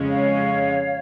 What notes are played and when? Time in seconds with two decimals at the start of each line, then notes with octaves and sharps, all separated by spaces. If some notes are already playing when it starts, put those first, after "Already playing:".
Already playing: F2 C#3 G#3 C#4
0.09 C#5 F5